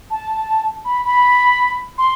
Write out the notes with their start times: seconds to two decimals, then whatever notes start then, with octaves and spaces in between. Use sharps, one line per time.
0.11 A5
0.85 B5
1.04 B5
1.98 C6